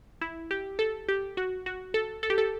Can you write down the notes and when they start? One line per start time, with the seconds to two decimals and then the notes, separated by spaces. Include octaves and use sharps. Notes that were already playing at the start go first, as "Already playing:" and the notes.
0.21 E4
0.51 G4
0.79 A4
1.09 G4
1.37 F#4
1.66 F#4
1.94 A4
2.23 A4
2.30 G4
2.38 A4